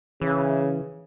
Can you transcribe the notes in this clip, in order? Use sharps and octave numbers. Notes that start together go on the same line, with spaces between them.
C#3 E3